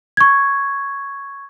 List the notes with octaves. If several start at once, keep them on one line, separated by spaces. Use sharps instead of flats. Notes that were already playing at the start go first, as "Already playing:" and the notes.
C#6 G#6